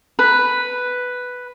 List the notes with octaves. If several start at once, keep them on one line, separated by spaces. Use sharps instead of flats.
B4